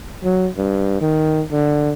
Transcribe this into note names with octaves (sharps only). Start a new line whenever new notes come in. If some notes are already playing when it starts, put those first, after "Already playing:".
F#3
G2
D#3
D3